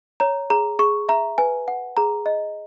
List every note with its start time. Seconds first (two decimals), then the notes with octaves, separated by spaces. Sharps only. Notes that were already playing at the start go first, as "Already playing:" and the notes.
0.20 C#5 A#5
0.50 G#4 A#5
0.79 G#4 C#6
1.09 E5 A#5
1.38 B4 G#5
1.68 F#5
1.97 G#4 A#5
2.26 D#5